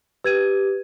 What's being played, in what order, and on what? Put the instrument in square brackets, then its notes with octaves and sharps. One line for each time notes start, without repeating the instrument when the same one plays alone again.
[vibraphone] G4 [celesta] B4 G#6 D#7